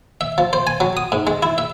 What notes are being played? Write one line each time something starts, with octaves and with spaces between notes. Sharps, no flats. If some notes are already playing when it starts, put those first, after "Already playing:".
E5
F3
C5
G#5
F#3
D#6
G#2
G#3
E4
E5